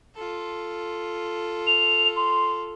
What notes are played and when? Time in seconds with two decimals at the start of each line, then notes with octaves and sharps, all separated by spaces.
0.14 F4 A4
1.67 F7
2.16 C6